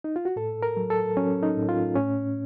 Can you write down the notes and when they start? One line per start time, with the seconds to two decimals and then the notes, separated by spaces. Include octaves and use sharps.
0.04 D#4
0.16 F4
0.25 F#4
0.36 A2 A4
0.63 A#4
0.77 F#3
0.90 A4
1.16 F#3 C#4
1.43 D#4
1.57 A2
1.69 F4
1.95 A2 C#4